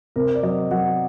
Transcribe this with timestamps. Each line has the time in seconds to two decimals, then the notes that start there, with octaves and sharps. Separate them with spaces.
0.16 C3 A#4
0.35 D5
0.43 F#3 D#5
0.71 F#3 F#5